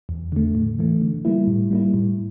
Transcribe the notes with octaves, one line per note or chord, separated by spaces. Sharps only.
E2
D3 A3
A2
E3 A3
D3
G3 A#3 E4
A2
G3 A#3 E4
A2